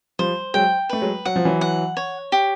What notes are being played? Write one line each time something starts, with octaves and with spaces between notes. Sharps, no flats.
F3 G3 C5
F#3 G#3 G5
A3 B4
F#3 G#3
F#3 F#5
F3
E3 F#3
F#5
C#5
G4